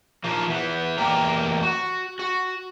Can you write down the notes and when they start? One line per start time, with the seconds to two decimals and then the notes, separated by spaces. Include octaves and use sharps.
0.24 D#3 F3 A#3
0.49 E3 B3
0.98 E2 A#3 G4 A#4
1.63 F#4 F#5
2.19 F#4